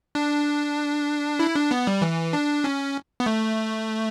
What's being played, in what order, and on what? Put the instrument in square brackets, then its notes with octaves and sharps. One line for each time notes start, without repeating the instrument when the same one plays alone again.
[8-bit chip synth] D4
E4
D4
B3
G3
E3
D4
C#4
B3
A3